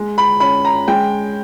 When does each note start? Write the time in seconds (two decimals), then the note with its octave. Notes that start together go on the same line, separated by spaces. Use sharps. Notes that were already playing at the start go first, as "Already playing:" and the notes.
Already playing: G#3
0.18 B5
0.40 C#4 B5
0.65 A#5
0.88 G#3 G5